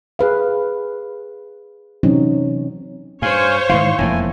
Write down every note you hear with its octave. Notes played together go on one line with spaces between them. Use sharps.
G#4 B4 F5
C3 E3 F#3 C4 C#4 D#4
G2 C5 C#5 F5 G#5
G#2 D#3 E3 F5 C6 C#6
E1 F2 A2 A#3 G#5